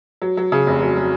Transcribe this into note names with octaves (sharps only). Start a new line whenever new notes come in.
F#3
F#3
C#3
F1
F#3
F#3